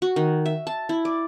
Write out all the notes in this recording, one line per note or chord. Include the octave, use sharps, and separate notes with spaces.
F#4
D#3
E5
A5
E4
D5